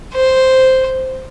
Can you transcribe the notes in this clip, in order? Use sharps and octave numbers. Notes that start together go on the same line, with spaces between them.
C5